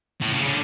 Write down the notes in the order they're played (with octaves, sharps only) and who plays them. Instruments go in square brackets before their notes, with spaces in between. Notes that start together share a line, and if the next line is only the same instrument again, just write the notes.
[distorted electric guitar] A2
C#3
D3